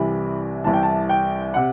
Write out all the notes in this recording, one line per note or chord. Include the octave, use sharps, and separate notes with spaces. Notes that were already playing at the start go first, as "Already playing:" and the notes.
Already playing: C2 C3 E3 B5
C2 C3 E3 A5
G5
A5
G5
C3 F#5